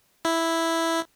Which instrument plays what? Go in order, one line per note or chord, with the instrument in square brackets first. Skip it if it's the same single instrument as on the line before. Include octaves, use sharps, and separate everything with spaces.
[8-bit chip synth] E4